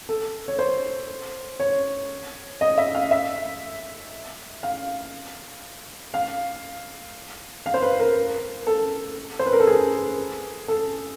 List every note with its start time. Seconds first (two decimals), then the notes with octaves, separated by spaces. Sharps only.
0.09 A4
0.48 C#5
0.59 C5
1.60 C#5
2.61 D#5
2.78 E5
2.95 F5
3.11 E5
4.63 F5
6.14 F5
7.66 F5
7.74 C5
7.82 B4
8.00 A#4
8.67 A4
9.39 C5
9.46 B4
9.53 A#4
9.60 A4
9.67 G#4
10.68 A4